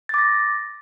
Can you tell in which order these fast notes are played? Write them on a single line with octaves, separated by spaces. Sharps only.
A6 D6 A#6